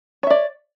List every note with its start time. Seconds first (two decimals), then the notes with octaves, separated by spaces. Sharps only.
0.23 C#5
0.27 E5
0.30 D5